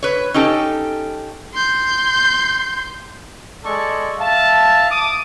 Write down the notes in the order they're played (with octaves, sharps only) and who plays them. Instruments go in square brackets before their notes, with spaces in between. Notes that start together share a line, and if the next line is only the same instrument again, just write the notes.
[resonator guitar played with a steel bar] B4 C#5
C#4 D#4 G4 A4
[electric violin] C6 G6
[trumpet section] G#3 A4 D5 C#6
E5 F5 A5
D6 D#6